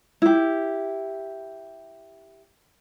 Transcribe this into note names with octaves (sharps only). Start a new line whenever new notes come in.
E4 G4